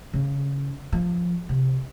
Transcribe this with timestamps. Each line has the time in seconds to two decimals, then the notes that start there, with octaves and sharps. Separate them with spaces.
0.13 C#3
0.92 F3
1.49 C3